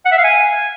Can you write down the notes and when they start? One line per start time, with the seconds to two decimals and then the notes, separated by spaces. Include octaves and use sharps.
0.06 F#5
0.12 E5
0.18 F5
0.24 G#5